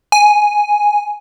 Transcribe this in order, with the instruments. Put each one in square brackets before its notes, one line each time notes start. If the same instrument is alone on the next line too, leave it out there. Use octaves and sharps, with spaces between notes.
[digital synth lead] G#5